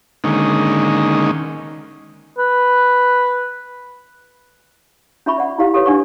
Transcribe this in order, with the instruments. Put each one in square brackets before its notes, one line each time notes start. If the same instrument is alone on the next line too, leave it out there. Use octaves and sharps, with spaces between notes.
[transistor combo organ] D3 D#3 G#3 A#3 C#4 D#4
[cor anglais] B4
[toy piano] C#4 F4 E5 B5 C#6
D5 F#5
E4 G4 F5
G4 A4 B4 C#5
D4 F#5 C#6